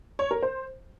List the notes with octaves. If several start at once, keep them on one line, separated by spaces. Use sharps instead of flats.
C#5
A#4
C5